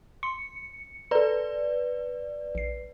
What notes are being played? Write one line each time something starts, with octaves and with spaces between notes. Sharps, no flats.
C6 C#7
A4 B4 D5 A#5
A#1 C7